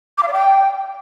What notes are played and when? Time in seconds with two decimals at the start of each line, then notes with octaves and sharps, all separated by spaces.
0.18 D6
0.23 F5
0.28 D5
0.33 G5